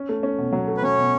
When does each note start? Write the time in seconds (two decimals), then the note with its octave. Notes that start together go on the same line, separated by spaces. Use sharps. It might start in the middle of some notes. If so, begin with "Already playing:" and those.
Already playing: C#4
0.09 A3
0.23 C#4
0.38 B2
0.52 F#3
0.68 A3
0.77 B4
0.82 F#3 C#4 C#5
0.98 B2